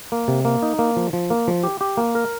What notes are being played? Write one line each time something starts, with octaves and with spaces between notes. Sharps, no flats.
A#3
C3
A#3
D#4
A#3
F3
F3
A#3
F3
G4
G4
A#3
A#4